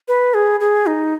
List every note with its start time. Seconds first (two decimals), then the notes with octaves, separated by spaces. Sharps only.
0.08 B4
0.34 G#4
0.60 G#4
0.87 D#4